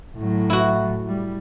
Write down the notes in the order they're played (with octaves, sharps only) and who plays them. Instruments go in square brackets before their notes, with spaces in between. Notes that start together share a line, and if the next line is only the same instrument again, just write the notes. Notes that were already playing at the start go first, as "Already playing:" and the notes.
[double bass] A2 F#3
[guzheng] E4 F#4
[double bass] G3